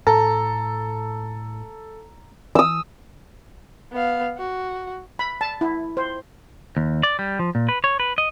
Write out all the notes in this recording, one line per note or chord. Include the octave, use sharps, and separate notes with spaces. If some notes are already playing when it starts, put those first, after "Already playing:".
A2 A4 A#5
E3 D#6 E6
B3 F5
F#4
B5
A5
E4
C5
D#2
D5
G3
F3
A#2
B4
C#5
B4
D#5